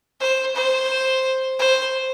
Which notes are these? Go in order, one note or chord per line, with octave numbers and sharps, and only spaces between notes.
C5
C5
C5